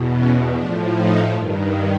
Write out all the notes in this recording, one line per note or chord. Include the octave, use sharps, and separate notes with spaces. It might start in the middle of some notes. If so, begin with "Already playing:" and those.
Already playing: E2 B2
C#4
A2 F3 D4
D#4
G2 D#3